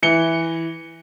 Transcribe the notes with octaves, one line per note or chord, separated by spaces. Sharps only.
E3 C#7 G7